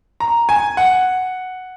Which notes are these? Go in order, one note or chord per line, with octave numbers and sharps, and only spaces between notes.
A#5
G#5
F#5